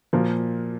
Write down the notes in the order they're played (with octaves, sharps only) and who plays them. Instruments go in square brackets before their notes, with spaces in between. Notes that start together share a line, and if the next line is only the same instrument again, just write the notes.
[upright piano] A#2 F3 A#4